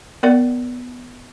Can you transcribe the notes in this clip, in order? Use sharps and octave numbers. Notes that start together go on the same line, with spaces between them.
B3 A#4 D5 F#5